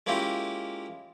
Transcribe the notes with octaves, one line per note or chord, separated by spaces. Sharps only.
G#3 A#3 C#4 E4 F4 G4